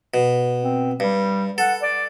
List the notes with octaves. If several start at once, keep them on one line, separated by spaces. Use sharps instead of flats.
B2
C4
G2 G3
A4 F#5
D5